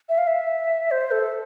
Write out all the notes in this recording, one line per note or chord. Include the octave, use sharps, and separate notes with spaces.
E5
F5
E5
C5
A4